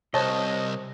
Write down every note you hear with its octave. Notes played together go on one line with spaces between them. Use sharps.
C2 C5 C#5 D#5 A5